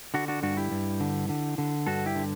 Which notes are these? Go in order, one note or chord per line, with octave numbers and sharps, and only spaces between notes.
D3 D4 F#4
D4 F#4
G2 D4 F#4
E4 G4
G2
D3
D3
D3
G2 F#4 A4
E4 G4
D3